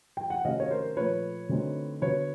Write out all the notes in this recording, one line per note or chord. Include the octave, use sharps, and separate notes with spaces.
G5
F#5
C3 D#3 F#3 A3 C#4 D#5 F5
C#5
A#4 C5
A#2 F3 A3 B4 C#5
D3 F#3 A3 C4 D#4
D3 F#3 B3 B4 C#5